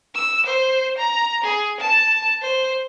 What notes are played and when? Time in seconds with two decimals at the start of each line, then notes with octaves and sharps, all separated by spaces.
0.15 E6
0.46 C5
0.98 A#5
1.44 G#4
1.80 A5
2.42 C5